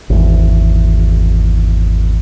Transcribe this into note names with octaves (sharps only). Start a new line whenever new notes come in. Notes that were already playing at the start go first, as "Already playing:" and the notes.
G#1 E2